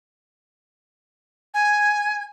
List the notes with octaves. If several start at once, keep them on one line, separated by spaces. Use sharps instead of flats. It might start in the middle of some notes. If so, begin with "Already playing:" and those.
G#5